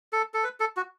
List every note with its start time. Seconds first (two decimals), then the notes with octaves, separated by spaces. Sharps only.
0.13 A4
0.34 A4
0.44 B4
0.60 A4
0.77 F#4